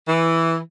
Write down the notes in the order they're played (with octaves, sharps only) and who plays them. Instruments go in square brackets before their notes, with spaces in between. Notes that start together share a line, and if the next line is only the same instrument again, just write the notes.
[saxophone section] E3